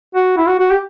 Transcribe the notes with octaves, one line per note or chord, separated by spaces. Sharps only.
F#4
E4
F#4
F#4
G4